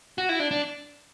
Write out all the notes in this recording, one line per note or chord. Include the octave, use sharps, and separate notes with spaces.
F#4
E4
D4
D4